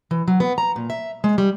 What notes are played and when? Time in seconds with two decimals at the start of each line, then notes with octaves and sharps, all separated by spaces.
0.11 E3
0.28 F#3
0.40 B3
0.58 A#5
0.76 A#2
0.90 E5
1.24 G#3
1.38 G3